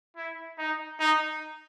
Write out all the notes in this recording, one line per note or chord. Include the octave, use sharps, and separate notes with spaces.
E4
D#4
D#4